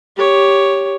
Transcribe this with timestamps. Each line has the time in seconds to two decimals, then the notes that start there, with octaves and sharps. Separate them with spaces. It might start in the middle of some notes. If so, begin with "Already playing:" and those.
0.17 G4 C#5